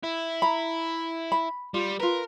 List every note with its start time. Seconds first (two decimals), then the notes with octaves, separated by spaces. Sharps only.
0.04 E4
0.42 A#5 B5
1.32 B5
1.74 G3 F4
2.00 F4 A#4 B4